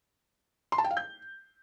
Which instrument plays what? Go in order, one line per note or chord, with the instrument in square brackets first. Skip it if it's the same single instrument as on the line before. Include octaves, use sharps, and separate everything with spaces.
[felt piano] C6
A5
G5
F5
G6